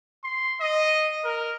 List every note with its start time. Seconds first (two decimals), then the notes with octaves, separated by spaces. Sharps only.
0.24 C6
0.61 D#5
1.25 A#4